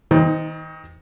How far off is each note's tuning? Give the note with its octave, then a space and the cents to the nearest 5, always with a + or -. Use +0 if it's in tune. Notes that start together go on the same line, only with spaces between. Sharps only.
D#3 +35 D#4 +0 C5 -20